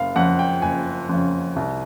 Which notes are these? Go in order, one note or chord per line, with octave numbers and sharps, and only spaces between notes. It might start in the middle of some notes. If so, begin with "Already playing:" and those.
Already playing: F#1 F5
F2 C#3 F#5
G5
F#1 G#5
F2 C#3
C2